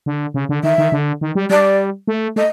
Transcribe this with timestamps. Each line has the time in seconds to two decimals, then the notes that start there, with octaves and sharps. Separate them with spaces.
0.06 D3
0.34 C#3
0.49 D3
0.63 D#3 E5
0.78 D#3
0.92 D3
1.21 D#3
1.35 G3
1.50 G3 D5
2.08 A3
2.36 A3 D#5